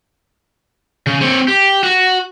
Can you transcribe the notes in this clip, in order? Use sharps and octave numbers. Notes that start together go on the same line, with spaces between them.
C#3
C4 C#5
G4
F#4